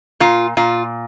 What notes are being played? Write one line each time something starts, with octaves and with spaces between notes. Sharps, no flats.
A#2 F4
A#2 F4